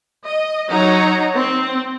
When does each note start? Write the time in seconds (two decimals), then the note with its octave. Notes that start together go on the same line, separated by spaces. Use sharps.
0.23 D#5
0.70 F#3 D#4 C#5 F#5 A#5
1.34 C4